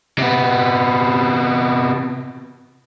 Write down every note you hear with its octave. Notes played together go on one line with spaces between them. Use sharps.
C3 B3